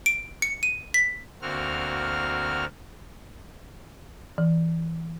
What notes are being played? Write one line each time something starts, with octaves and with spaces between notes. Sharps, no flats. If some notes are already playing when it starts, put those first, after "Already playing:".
D7
C#7
D#7
B6
D2 A#3 C4 F#4 F6
E3